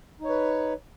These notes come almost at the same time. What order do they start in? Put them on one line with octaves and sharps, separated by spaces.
D#4 C#5 B4